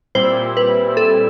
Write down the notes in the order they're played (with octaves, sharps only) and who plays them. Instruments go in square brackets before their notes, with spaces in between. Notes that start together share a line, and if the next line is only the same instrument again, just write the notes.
[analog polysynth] A#2 G3 C4 E4 [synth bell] C5
[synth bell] B4
A4